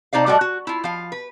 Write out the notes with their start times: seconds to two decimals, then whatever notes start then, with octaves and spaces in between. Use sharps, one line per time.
0.13 C3 D#4 C5 D5 F5
0.26 A2 G3 F#4 A4 D5 D#5
0.41 F#4
0.67 E4 F4
0.84 F3 F5
1.12 B4